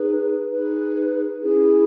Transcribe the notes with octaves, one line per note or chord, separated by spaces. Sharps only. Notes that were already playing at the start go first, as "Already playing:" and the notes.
Already playing: D#4 G#4 B4
D#4 G#4 B4
C#4 E4 G#4